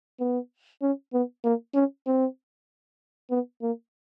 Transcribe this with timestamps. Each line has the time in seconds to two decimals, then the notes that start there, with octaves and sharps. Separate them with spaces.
0.20 B3
0.82 C#4
1.13 B3
1.44 A#3
1.75 C#4
2.07 C4
3.30 B3
3.62 A#3